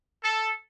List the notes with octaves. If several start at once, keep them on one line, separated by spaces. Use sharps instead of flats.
A4